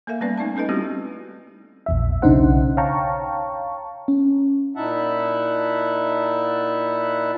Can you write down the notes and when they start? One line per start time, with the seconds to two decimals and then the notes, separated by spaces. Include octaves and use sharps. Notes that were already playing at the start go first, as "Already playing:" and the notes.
0.07 A#3 A4 A#4 E5 F5
0.21 G3 A#3 B3 C#4 B4 D5
0.38 A3 D#4 D5 A5
0.55 A3 C#4 D#4 A4 B4 D#5
0.69 G3 B3 C4 E4 F#4 G4
1.86 A#1 E2 E5
2.22 B1 C#3 D4 D#4 C5 F#5
2.77 C#5 F5 G5 A5 A#5 C#6
4.08 C#4
4.76 A#2 D#4 E4 E5 F#5 A5